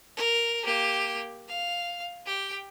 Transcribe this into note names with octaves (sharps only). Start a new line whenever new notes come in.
A#4
A#3 G4
F5
G4 G5